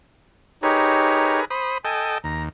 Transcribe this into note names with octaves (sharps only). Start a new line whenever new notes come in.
D#4 G4 G#4 A#4 B4 C#5
C5 B5 D#6
A4 D#5 G5 G#5
D#2 A#5